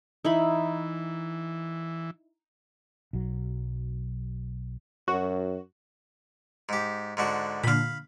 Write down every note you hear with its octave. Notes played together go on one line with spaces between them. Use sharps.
E3 D#4 E4 B5
B1 F#3
F#2 F#4
G#2 G4
G#2 D3 F#4
A#2 D3 F5 B5